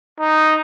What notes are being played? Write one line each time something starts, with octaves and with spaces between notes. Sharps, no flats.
D#4